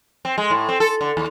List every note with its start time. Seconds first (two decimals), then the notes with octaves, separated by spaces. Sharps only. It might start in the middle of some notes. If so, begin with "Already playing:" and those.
0.25 C4
0.38 G#3
0.50 A2
0.69 C4
0.80 A4
1.01 D3
1.17 D#2